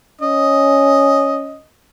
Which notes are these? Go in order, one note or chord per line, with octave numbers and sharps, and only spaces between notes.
C#4 D#5